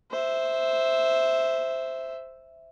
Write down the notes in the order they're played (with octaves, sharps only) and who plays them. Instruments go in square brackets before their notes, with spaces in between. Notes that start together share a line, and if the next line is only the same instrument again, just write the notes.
[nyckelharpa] C5 E5